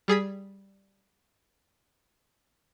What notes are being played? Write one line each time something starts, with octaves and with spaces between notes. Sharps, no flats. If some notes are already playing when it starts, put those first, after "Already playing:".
G3 G#4 G#6 B6